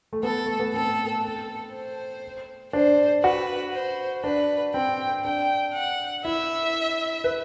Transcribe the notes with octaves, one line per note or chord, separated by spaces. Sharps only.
A3
B3 A4
A3
B3
C4 A4
A4
C5
D4 C5
F#4 B4
C5
D4 B4
C4 G5
D4 G5
F#5
E4 E5
B4